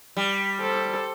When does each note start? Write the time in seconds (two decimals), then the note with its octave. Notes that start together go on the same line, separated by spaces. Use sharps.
0.17 G3
0.60 A4 C5